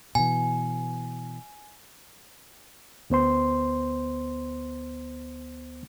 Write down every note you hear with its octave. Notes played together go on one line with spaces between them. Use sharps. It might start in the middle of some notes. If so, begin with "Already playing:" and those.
B2 E3 G#5
D2 B3 C5 C6